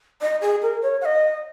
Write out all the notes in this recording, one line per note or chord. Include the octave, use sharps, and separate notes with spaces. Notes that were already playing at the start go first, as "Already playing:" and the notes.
D#5
G#4
A#4
C#5
F#5
D#5